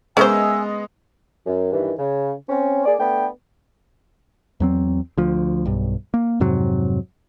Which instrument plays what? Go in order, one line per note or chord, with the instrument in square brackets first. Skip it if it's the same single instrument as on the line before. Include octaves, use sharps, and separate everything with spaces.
[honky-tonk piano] G#3 B3 D#5 [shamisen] C#4 A#4 C5 [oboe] E5 [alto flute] G#5
[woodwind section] F#2
G2 D#3 E3
C#3
C4 C#4
A#3 G#4 D5
A3 B3 D4 B4 G5
[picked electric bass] E2 F#3 C4
D2 F3
B1 G2
A#3
F2 G#2 C3 F#3